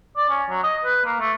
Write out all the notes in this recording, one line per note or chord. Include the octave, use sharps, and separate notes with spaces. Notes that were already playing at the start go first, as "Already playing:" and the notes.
D5
C#4
F#3
D#5
B4
A#3
A3